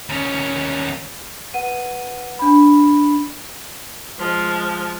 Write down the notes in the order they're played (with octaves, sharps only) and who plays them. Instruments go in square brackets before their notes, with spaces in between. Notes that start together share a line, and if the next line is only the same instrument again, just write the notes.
[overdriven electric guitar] D#2 C#4
[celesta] B4 F#5 D#7
D4 B5
[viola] F3 G#3